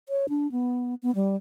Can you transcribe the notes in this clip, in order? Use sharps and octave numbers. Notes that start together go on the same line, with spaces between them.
C#5
D4
B3
B3
G3